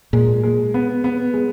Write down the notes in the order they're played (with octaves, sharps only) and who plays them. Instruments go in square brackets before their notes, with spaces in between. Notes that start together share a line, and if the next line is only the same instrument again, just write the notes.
[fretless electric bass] A#2 [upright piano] G#3
[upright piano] G#3
B3
B3
G#3